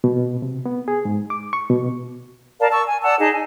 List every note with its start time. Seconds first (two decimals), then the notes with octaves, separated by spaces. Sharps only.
0.04 B2
0.42 C3
0.66 B3
0.88 G#4
1.05 G#2
1.30 D6
1.53 C#6
1.70 B2
2.60 A#4 D5 F5 A5
2.72 A5 C#6 E6
2.87 G#5
3.04 D5 F#5 A5 E6
3.19 D#4 G#4 D#5 A5
3.32 G#5